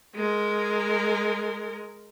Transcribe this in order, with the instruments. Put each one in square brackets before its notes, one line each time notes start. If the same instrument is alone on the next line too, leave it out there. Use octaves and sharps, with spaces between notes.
[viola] G#3 A#4